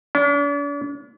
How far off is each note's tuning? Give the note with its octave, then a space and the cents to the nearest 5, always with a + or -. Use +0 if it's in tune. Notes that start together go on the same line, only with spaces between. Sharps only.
D4 -45